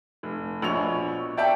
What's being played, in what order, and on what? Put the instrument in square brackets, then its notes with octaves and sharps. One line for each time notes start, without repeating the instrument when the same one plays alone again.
[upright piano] F1
[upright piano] A#1 F7 [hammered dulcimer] B2 C#5
[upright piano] D5 E5 A5 [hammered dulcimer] G5